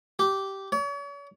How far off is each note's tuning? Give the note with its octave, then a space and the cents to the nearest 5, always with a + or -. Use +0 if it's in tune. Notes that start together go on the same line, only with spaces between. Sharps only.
G4 -10
C#5 +40